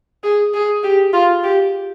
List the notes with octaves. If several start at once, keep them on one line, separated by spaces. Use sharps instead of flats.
G#4
G#4
G4
F4
G4